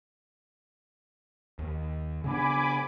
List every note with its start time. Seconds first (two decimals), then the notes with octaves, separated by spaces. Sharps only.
1.59 D#2
2.24 C#3 B3 D4 G#5 B5 D6